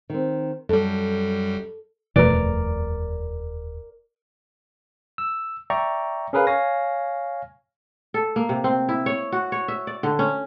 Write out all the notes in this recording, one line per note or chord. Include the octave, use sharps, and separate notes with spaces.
D#3 C4
F#2 G3 A4
D#1 F2 B2 E3 A3 A#4 B4 D5
E6
D5 E5 G5 A#5 C#6
C#4 G#4 A#4 B4 F5
C#5 F5 G#5 A#6
A4
A#3
C3
C4
E4
C#5
F#4
C#5
E5
D5
D3
C#4